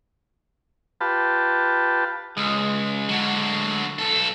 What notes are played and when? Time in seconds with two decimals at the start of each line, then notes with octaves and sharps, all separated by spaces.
1.01 F4 G4 B4 A5
2.37 C#2 G#3
3.09 D3 F#3
3.98 B1 A4